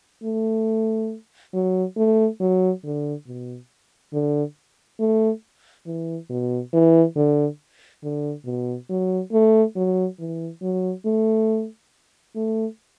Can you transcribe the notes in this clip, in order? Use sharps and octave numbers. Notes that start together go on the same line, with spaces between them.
A3
F#3
A3
F#3
D3
B2
D3
A3
E3
B2
E3
D3
D3
B2
F#3
A3
F#3
E3
F#3
A3
A3